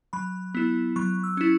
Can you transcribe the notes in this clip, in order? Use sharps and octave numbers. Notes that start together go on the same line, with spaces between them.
F#3 B5
B3 E4
F#3 C#6
E6
C#4 E4